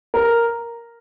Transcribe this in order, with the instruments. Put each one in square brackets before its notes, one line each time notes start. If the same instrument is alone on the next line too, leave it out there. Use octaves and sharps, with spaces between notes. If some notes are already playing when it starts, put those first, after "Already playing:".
[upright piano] A#4